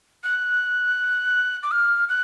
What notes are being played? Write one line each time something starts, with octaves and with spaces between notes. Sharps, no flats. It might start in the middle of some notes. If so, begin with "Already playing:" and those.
F#6
D6
F6
F#6